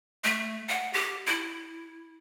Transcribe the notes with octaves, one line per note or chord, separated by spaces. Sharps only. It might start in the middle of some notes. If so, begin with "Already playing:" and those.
A3
F#5
G4
E4